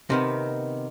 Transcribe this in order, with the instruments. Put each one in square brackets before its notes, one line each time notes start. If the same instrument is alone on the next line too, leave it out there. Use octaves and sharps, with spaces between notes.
[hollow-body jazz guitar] C3 D#3 B3